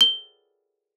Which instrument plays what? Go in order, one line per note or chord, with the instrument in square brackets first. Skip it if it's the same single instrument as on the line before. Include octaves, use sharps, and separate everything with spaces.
[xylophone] G7